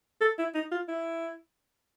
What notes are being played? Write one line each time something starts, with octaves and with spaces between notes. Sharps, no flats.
A4
E4
D#4
F4
E4